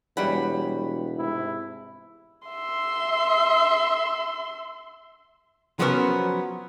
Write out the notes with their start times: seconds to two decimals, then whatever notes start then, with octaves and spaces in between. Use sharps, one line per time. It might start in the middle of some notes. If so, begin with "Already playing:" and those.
0.17 E1 G3 C#5 F#5 B5
1.17 G#2 C3 E4
2.48 E5 C6
5.79 F3 F#3 B3 C#4 A#4